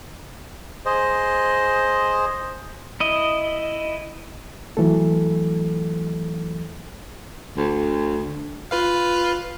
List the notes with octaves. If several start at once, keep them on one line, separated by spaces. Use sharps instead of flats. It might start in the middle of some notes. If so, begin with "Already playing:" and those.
G#4 C5 D#5
E4 D#5
E3 F#3 A3 A4
D2
F4 B4 F5